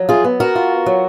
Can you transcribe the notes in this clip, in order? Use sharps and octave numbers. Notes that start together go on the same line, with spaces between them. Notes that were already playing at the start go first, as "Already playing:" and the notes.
Already playing: F3 F#3
F4 G#4
B3
F#4 A#4
F4
F#3